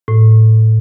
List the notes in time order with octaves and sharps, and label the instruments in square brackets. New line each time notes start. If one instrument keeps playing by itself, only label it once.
[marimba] A2